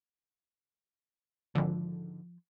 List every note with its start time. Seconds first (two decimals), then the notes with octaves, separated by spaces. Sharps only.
1.55 G#1 D3 F3